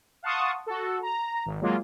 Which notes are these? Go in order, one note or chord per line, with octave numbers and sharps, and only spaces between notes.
F5 F#5 A5 C6 C#6 D#6
F#4 A4
A#5
G#1
F#3 G#3 A#3 F4